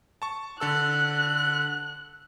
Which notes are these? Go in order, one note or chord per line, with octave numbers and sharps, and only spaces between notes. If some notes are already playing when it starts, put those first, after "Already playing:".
A5 C#6
D3 A4 E6 F#6